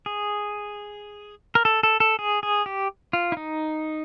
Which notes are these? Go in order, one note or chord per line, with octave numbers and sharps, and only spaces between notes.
G#4
A#4
A4
A4
A4
G#4
G#4
G4
F4
E4
D#4